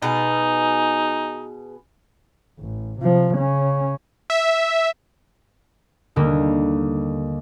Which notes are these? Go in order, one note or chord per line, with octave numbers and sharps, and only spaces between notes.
B2 D#4 G#4
A1
C3 F3
C#3 C#4
E5
D#2 D3 G3 A#3